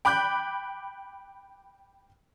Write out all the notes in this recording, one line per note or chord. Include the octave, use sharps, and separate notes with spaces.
G5 B5 D6 F#6 G6